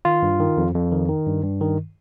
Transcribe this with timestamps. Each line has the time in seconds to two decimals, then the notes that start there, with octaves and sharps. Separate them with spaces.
0.05 D#3 F4
0.22 G2
0.40 D#3
0.57 F2
0.74 F2
0.92 D#3
1.08 D#3
1.26 G2
1.43 G2
1.61 D#3